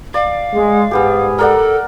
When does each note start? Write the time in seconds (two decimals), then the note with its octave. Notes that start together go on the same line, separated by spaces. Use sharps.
0.14 D5 F5
0.54 G#3
0.91 G#2 G3 B3 G4 G#4
1.39 A4 A#4 D5 F#5